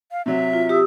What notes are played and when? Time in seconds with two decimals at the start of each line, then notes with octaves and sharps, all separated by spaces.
0.12 F5
0.26 C3 F#3 E5
0.53 F4
0.69 G4 D#6 E6